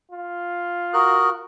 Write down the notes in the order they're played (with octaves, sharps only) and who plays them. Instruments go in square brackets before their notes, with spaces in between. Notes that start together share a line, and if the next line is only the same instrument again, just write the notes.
[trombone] F4
[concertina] F#4 A#4 F#6 [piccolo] D#6